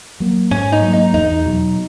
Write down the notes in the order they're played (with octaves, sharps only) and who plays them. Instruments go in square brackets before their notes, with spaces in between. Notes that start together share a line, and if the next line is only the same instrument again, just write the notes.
[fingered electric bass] F#3 A#3
[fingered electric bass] G#2 [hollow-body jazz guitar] C#4
[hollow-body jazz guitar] D#4
[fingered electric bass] F#3 A#3
[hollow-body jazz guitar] D#4
[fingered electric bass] E2 [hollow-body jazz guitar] D#4
[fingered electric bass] B2 F#3